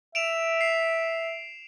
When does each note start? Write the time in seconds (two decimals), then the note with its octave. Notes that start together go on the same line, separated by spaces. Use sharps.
0.15 E5 D7 E7 F7
0.61 C7